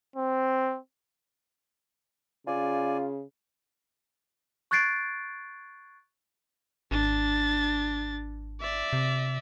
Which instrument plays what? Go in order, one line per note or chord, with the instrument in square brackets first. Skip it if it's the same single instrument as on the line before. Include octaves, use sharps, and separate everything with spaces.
[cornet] C4
[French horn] C#3 [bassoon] F4 [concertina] D5 G#5
[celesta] C#6 F#6 G#6 A6 C7 D7
[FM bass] G#1 [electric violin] D4 A6
[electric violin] D5 E5
[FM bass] C3